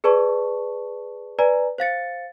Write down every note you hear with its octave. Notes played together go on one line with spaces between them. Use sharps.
G#4 B4 D5 A5 C#6
B4 D5 G#5 A#5
C5 F5 A6 C#7